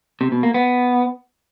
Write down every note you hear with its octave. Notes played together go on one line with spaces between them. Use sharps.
C3
B2
A#3
B3